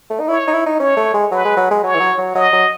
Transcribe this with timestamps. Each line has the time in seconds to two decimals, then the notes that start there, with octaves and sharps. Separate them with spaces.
0.10 A3
0.20 D#4
0.28 E4 C#5
0.47 D#4
0.53 E4
0.66 D#4
0.79 C#4 C#5
0.97 A3
1.14 G#3
1.32 F#3 B4
1.45 G#3
1.57 F#3
1.71 G#3
1.84 F#3 C#5
1.95 E3
2.00 F#3
2.18 F#3
2.35 F#3 D#5
2.53 F#3